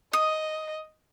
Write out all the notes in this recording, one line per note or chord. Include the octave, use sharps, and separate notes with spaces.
D#5 D#6